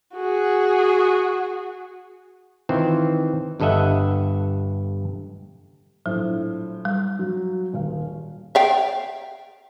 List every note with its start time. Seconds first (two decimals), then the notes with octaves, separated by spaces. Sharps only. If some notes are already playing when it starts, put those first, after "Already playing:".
0.14 F#4 G#4
2.69 D#3 E3 C4 F4 C5
3.60 G1 G2 A4 D#5 E5 F#5
6.06 A#1 A2 F#3 C5
6.85 G3
7.19 F#3
7.74 D#1 F5
8.55 E5 F5 G5